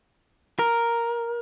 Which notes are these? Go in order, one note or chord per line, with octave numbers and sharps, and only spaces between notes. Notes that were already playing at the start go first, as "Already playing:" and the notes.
A#4